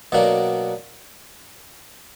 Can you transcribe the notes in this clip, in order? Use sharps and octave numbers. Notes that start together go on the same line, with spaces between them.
B2 F#3 A#3 D4